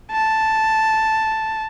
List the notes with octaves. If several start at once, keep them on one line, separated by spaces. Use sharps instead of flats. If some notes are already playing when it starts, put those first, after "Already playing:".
A5